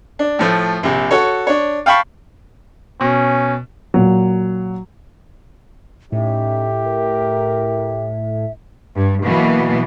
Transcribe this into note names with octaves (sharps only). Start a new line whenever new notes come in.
D4
A2 F3 A3
A#1 C3
F#4 A4 C#5
D4 C#5
F5 G5 A5 B5 C#6
B2 C#4
A#2 F#3
A2 C#4 D#4 G4 E5
A#4
G2
B2 E3 F#3 A#3 B3